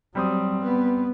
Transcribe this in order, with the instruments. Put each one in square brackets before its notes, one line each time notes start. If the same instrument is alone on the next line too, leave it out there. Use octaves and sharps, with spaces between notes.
[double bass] F#3 [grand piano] G3 C4 D#6
[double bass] B3